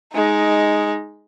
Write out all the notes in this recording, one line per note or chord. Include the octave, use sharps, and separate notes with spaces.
G#3 D#4